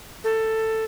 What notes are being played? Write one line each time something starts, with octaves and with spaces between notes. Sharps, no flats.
A4